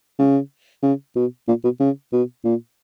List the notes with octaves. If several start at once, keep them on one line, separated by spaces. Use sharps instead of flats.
C#3
C#3
B2
A#2
B2
C#3
B2
A#2